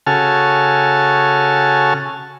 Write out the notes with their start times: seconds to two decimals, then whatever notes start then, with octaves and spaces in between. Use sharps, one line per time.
0.07 C#3 F#4 A4 G#5 A5 F6